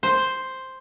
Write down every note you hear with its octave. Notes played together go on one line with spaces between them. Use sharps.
C5